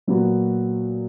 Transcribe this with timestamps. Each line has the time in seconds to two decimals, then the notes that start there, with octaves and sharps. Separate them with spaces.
0.07 A#2 F#3 B3 F#4